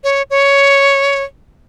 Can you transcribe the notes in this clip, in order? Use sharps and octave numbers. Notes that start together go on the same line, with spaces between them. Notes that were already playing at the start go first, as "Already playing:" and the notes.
C#5
C#5